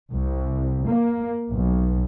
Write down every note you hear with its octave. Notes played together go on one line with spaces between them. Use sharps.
C2
A#3
B1